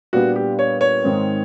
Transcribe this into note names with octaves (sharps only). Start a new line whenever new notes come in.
A#2 G3 B3 D4 F#4
G4
C#5
C#5
G#2 D#3 G#3 C4